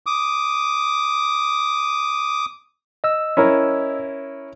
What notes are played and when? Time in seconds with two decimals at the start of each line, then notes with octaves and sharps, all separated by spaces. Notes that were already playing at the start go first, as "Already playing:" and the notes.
0.06 D6 D#6
3.04 D#5 E6
3.37 C#4 E4 A#4